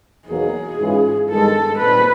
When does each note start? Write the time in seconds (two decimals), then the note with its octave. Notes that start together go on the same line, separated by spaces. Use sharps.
0.27 E2 B2 F#3 A#3 D#4 G#4
0.78 G#2 E3 G#3 C#4 F4
1.28 G2 D#3 G#3 A4
1.79 A#2 G3 C4 D#4 B4